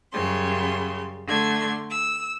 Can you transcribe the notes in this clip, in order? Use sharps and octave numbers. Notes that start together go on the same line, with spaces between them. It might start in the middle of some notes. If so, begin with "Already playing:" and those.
F#2 C#3 G3 C6
D3 A3 C6 G#6
E6